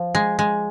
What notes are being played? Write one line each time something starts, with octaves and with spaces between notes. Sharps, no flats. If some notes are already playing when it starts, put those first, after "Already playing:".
Already playing: F3
G#3
G#3